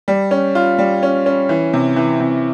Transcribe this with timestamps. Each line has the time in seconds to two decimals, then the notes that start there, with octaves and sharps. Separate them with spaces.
0.08 G3
0.31 C#4
0.55 F4
0.79 G3
1.03 C#4
1.26 C#4
1.49 E3
1.73 C3
1.96 E3
2.20 C3